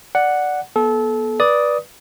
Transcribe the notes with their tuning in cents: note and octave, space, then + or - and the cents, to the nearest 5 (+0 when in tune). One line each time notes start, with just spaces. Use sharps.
D5 +0 F#5 +0
B3 -35 A4 -25
B4 -20 D5 +0 D#6 +10